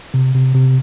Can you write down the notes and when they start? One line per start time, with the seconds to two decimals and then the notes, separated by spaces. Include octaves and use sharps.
0.14 C3
0.34 C3
0.55 C3